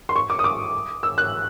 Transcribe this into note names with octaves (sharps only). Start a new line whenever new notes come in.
C6
C#6
D6
D#6
D6
E6
F#6